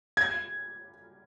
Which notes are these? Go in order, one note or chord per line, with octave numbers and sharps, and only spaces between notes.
G#6